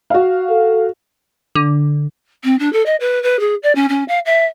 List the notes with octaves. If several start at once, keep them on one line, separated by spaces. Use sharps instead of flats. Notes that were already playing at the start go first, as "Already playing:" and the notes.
F#4 F5
A4
D3
C4
D4
A4
D#5
B4
B4
G#4
D5
C#4
C#4
F5
E5